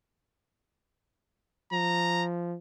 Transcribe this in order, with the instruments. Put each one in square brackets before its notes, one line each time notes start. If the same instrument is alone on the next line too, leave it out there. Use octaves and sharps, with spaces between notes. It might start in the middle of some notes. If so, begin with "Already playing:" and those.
[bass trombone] F3 [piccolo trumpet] A#5